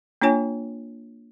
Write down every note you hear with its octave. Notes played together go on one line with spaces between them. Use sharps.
A#3 D4 F4 C#5 G#5